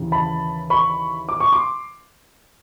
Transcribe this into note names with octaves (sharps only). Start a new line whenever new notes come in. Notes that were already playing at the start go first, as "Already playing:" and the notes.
Already playing: D#2 C#3 E3
A5 B5
B5 C#6
D6
C#6
C6 D6